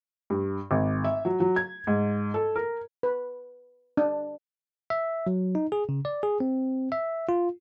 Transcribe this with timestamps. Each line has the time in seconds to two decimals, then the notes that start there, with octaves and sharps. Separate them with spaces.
0.30 G2
0.71 G#1
1.04 E5
1.25 F#3
1.40 F#3
1.56 G#6
1.87 G#2
2.34 A4
2.56 A#4
3.03 B4
3.97 D4
4.90 E5
5.27 F#3
5.55 D#4
5.72 G#4
5.89 C#3
6.05 D5
6.23 G#4
6.40 C4
6.92 E5
7.29 F4